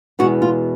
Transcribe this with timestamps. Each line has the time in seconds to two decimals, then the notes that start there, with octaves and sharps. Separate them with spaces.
0.19 E2 B2 G#3 F#4
0.42 F4